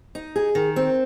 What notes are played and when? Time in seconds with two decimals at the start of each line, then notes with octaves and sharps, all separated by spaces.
0.15 D#4
0.36 G#4
0.55 D#3
0.76 C4